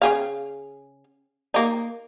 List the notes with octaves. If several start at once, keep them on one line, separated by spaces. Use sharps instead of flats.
C#3 G#4 F5
A#3 D#4